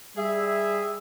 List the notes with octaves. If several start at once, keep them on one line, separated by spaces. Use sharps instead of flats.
G3 G#4 E5